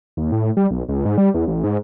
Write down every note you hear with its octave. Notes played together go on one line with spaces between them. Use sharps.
D#2
A2
G3
B1
C#2
G#2
G3
E2
A1
G#2